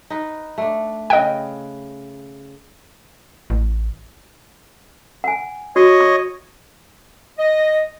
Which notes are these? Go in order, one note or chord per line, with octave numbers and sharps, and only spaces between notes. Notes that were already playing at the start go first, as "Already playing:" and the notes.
D#4 B4
A3 D4
C#3 B4 D#5 G5
A1
F#5 G#5
F#4 C#5 D#5
C#6
D#5